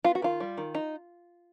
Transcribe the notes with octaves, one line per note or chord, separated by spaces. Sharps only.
B3 F4
F#4
D#3 F4
G3
D#3
D#4